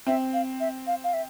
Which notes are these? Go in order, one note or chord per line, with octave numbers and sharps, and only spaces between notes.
C4 E5
F5
E5
F5
F5
E5